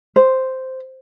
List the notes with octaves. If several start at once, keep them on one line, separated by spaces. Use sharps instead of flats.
C5